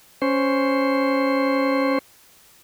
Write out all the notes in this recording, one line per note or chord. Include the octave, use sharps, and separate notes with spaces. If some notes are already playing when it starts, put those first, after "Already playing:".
C#4 C5